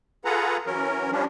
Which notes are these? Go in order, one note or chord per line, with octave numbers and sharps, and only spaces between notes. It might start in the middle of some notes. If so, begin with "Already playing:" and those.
F4 G#4 A4 B4 F#5 A#5
E3 F#3 C#4 A#4
F3 G3 C#4 D4